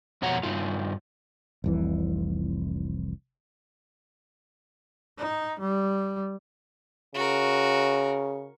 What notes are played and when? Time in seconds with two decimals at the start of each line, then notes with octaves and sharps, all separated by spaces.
0.22 F2 B2 C#5 F#5 A#5
0.43 G2 D#4 F4
1.64 F1 C2 E3
5.18 D#4
5.60 G3
7.15 C#3 F#4 A#4